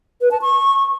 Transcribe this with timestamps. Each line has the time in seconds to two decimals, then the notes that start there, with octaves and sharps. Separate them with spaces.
0.21 B4
0.31 A5
0.42 C#6